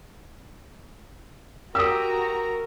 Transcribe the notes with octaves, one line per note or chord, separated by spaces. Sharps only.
F#4 G4 A#4 A#5 D#6 E6